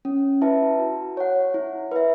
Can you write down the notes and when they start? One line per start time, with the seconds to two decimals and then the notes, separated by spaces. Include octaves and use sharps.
0.05 C#4
0.42 E4 B4 E5 A5
0.80 F#4
1.17 C#5 F#5
1.54 E4
1.91 B4 E5